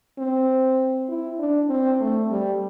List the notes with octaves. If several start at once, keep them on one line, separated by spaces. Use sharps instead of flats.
C4
E4
D4
C4
A3
G3